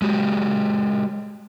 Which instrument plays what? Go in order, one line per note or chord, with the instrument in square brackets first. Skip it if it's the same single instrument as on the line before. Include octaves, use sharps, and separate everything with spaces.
[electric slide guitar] G#3 F#4 G4